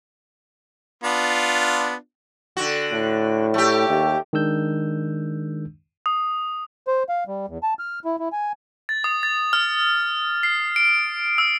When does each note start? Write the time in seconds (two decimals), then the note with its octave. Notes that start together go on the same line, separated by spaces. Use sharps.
1.04 B3 D4 F4
2.57 D3 F#4
2.92 A2
3.54 A3 G4
3.89 D#2
4.33 D#3 G#3 D4 E6 G6
6.06 D#6
6.87 C5
7.09 F5
7.27 G3
7.48 E2
7.63 A5
7.79 F6
8.05 E4
8.19 E4
8.33 G#5
8.89 A6
9.04 D#6
9.23 A6
9.53 F6
10.43 C7
10.76 D7
11.38 E6